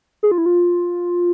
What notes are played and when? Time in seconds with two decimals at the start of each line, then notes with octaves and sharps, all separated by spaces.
0.23 G#4
0.31 F4
0.38 E4
0.46 F4